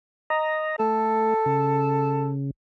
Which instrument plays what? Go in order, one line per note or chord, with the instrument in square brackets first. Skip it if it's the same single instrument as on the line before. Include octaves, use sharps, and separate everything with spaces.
[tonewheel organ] D#5 A#5
[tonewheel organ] A3 [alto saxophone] A4
[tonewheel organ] C#3